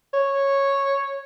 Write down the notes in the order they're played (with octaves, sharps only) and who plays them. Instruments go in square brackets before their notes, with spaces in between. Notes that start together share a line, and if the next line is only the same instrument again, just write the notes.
[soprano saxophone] C#5